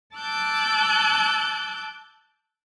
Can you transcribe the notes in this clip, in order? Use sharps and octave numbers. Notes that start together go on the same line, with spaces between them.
A5 D6 E6 F#6 G6 A6